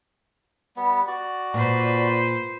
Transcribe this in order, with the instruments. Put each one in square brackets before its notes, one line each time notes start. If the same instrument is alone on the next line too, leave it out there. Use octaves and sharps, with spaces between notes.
[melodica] G3 B3
F#4 D5
[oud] A#2 [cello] B4 C5